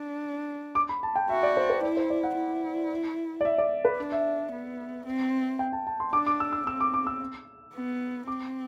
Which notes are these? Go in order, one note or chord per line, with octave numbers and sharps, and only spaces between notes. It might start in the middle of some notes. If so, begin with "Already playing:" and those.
Already playing: D4
D6
B5
A5
G5
F#4 E5
D5
C5
B4
E4 D5
C5
D5
F#5
E4
D5
E5
D5
B4
D4
E5
B3
C4
G5
A5
A5
C6
D4 D6
D6
E6
E6
C4 E6
D6
D6
E6
B3
C4 D6